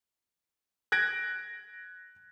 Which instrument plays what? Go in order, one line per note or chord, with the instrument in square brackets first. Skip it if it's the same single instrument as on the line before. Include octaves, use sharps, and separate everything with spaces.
[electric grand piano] F#6 G#6 A#6 D7